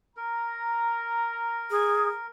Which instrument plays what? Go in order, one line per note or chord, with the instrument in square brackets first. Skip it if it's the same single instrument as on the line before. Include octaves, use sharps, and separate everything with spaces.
[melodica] A#4 [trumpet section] A#5
[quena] G#4